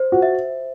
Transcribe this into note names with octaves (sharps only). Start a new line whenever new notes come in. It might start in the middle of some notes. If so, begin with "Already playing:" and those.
Already playing: C5
F#4
E5